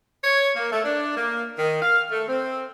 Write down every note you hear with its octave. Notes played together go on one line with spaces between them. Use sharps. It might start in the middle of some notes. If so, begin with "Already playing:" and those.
C#5
A#3
A3
D4
A#3
D#3
F5
A3
C4